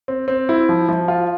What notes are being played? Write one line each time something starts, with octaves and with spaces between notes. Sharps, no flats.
C4
C4
E4
F3
F3
F4